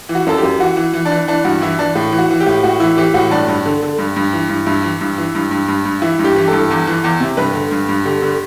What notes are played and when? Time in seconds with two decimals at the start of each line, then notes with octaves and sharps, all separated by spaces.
0.09 E3
0.15 F#4
0.26 F#2 A4
0.38 F#2 G4
0.60 E3 F#4
0.77 E3
0.93 E3
1.05 D4
1.12 E3
1.28 E3 D4
1.45 G2 F#4
1.62 E3 E4
1.79 E3 D4
1.95 A2
2.13 E3
2.18 F#4
2.30 E3
2.40 G4
2.46 A2
2.63 A2 F#4
2.80 E3 E4
2.97 E3 G4
3.14 A2 F#4
3.30 G2 D4
3.48 G2
3.66 D3
3.83 D3
3.98 G2
4.16 G2
4.33 E3
4.49 G2
4.67 G2 E4
4.83 E3
5.01 G2
5.18 E3
5.35 G2
5.51 G2
5.68 G2
5.85 G2
6.02 E3 E4
6.19 G2
6.24 G4
6.36 E3
6.48 G2 A4
6.70 E2
6.87 E3
7.04 E2
7.20 C3
7.37 G2 B4
7.55 D3
7.71 G2
7.89 G2
8.05 D3 G4
8.22 D3